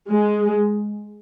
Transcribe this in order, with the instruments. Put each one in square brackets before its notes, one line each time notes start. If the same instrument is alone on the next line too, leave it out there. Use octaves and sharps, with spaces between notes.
[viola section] G#3